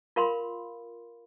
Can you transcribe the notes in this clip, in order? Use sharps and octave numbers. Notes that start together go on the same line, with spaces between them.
F4 A#4 F5 B5 C6